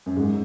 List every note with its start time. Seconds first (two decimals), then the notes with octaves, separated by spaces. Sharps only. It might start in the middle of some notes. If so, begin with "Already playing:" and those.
0.06 F#2
0.16 G#2